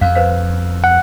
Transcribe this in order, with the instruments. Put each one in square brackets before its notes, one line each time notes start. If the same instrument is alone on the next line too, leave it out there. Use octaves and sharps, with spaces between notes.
[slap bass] F2 [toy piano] F5
[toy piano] B4 C5 F5
[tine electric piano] F#5